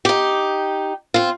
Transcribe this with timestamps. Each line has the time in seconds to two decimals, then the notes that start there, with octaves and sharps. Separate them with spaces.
0.05 D#4 G4
1.14 C4 F4